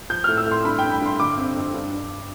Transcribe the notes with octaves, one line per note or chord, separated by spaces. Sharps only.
F3 G6
A2 F6
E6
A2 C6
G2 B5
G5
G2
B5
G2 C6
D3 D6
C4
F2
G2
G2